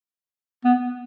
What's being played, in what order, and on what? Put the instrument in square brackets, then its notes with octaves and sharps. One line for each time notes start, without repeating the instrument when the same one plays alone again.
[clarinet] B3